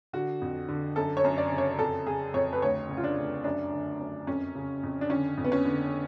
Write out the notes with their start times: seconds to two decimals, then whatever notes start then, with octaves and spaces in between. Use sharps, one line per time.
0.13 D3 F#4
0.41 F2
0.69 D3
0.96 F#2 A4
1.17 C#5
1.24 F#2
1.38 D5
1.52 C#3
1.58 C#5
1.79 F2 A4
2.07 C#3 G#4
2.34 F2 C#5
2.53 B4
2.62 D2 C#5
2.89 C#3
2.97 F4
3.04 D4
3.17 D2
3.44 F#2 D4
3.72 D3
4.00 F#2
4.27 F2 C#4
4.55 C#3
4.83 F2
5.01 D4
5.10 D3 C#4
5.37 F2
5.45 B3
5.52 C#4
5.65 D3